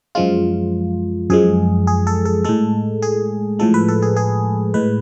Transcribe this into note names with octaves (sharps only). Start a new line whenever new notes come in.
F#2 F3 G#3 F4
F#2 F3 G#3 G#4
G#4
A4
A4
A2 G#3 A4
G#4
A2 F3 G#3 A4
B4
A4
G#4
G#4
A2 G#3 B4